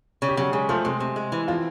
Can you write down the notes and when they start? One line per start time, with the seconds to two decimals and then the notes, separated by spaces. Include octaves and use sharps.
0.22 C#3
0.29 G4
0.37 C#3 F#3 F#4
0.52 C#3 G#3 G#4
0.69 F3 A3 A4
0.84 C3 G#3 G#4
1.00 C3
1.16 G#3
1.32 E3
1.48 F3 C4 F4